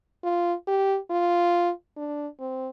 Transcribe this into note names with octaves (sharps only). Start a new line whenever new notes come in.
F4
G4
F4
D4
C4